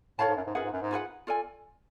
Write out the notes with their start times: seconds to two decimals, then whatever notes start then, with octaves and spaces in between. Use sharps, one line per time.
0.19 A2 A4 C#5 F5 A5
0.28 G#2
0.36 F#2
0.46 G#2
0.55 F#2 F4 G#4 B4 F#5
0.64 G#2
0.73 F#2
0.82 G#2
0.91 F4 G#4 B4 F#5
1.27 F4 A4 D5 G#5